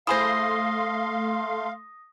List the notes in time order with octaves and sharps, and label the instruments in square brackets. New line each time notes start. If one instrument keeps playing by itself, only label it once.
[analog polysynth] A3 C6 [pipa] E4 G#4 C5 [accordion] F5 [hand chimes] D#6 A#6